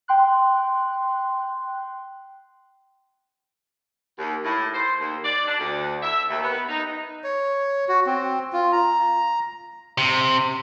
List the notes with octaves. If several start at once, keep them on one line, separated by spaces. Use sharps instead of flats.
G5 C6 F#6
D#2
A2
C5
D#2
D5
D4
D2
E5
D#2
B3
D#4
C#5
F#4
C4
F4
A#5
C3